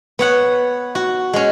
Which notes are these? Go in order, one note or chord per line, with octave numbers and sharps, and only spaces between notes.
B3 C#5 F#5
F#4
G#3 C#4